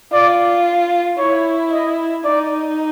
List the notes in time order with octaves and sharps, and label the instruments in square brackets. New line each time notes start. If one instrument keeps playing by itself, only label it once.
[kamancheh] F4 [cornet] D5
[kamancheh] E4 [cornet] C#5
[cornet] D#5
[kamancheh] D#4 [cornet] D5